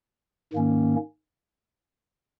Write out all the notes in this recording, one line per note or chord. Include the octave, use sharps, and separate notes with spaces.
G#2 D#3 A#3 C#4